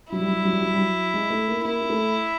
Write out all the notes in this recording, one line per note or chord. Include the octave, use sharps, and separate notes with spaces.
F#3 E4
G3
F#3
G3
F#3
G3
F#3
G3
F#3
G#3
A3
A#3
A#3 E4
A#3
A3